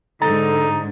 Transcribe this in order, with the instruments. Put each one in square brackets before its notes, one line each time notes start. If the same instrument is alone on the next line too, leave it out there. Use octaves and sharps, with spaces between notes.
[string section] G#2 D3 [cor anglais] D#4 [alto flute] A4 [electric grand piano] A#5 A6